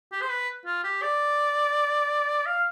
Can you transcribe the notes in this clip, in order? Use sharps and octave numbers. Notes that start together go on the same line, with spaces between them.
G4
C5
B4
F4
G4
D5
F5